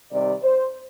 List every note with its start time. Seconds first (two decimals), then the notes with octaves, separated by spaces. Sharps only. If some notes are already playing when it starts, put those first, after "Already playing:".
0.12 C3 D#3 G3 D5
0.43 C5